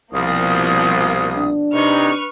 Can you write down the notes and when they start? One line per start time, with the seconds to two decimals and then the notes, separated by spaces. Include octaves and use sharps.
0.14 C2 B2 F3 A#3 F5 D#6
1.36 D4
1.74 C3 D#4 B4 C#6 F6